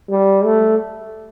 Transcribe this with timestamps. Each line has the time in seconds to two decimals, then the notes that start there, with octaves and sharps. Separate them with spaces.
0.10 G3
0.45 A3